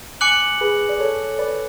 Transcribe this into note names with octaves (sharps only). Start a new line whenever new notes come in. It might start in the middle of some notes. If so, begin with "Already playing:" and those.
G#5 D6 F#6 C#7 F#7
G#4 B4
D5
A4 C#5
B4 D5